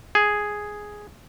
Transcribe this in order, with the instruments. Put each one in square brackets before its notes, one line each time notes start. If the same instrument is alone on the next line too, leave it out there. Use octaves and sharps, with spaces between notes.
[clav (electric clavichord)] G#4